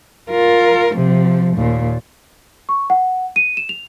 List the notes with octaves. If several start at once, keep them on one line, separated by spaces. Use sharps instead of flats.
F4 A#4
C3 F3
D#2 A#2
C#6
F#5
D#7
E7
F7